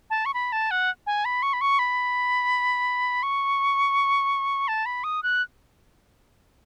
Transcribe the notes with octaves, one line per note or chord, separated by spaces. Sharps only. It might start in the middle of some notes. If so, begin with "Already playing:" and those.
A5
C#6
B5
A5
F#5
G#5
B5
C#6
B5
C#6
B5
C#6
A5
B5
D#6
F#6